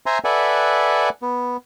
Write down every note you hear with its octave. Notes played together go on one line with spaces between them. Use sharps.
C5 E5 G#5 A#5 C6
A4 B4 D5 E5 F#5 G#5
B3